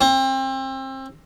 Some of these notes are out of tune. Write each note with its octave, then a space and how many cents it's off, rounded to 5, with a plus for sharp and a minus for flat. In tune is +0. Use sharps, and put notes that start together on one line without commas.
C4 +30